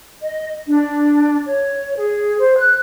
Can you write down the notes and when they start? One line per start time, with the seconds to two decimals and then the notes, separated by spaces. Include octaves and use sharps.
0.22 D#5
0.66 D4
1.46 C#5
1.97 G#4
2.40 C5
2.58 F#6